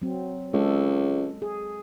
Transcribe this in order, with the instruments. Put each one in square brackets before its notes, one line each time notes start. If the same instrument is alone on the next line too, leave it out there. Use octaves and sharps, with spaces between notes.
[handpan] F#3 C4
[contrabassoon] C#2 [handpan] G#3 A4
[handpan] G#4